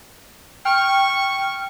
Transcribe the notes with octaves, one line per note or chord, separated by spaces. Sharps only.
G5 C#6 F6